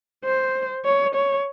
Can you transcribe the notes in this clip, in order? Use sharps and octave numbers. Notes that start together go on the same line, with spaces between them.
C5
C#5
C#5